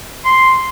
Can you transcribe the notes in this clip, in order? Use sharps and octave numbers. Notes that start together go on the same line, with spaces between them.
C6